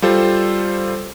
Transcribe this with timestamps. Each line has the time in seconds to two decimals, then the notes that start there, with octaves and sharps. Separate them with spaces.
0.02 G3 F4 A4 C5